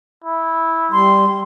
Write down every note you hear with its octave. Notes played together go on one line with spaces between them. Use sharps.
E4
G3 C6